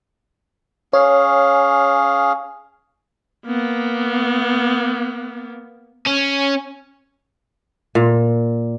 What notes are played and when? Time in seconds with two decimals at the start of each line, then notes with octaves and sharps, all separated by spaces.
0.93 C#4 G#4 C#5 F5
3.46 A#3 B3
6.06 C#4
7.95 A#2